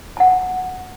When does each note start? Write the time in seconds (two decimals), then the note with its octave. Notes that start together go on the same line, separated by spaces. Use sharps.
0.17 F#5 A5